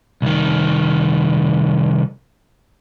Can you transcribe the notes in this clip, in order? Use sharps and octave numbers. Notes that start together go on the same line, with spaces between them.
C2 D#3